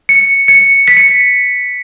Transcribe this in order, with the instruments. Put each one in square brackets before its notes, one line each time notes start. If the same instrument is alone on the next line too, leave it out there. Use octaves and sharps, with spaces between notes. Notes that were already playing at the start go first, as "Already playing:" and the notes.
[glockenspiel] C#7
C#7
B6
C#7